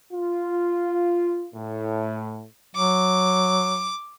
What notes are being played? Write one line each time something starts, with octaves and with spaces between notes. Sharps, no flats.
F4
A2
F#3 D6